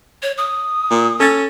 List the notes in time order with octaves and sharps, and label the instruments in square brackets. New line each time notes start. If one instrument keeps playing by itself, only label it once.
[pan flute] C#5
D#6
[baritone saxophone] A#2
[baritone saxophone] C#4 [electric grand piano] A4 A6